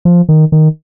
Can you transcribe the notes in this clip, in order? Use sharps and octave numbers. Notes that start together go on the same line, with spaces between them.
F3
D#3
D#3